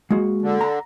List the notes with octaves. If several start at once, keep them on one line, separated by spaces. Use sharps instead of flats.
G#3 A#3 F#4
D3
A#5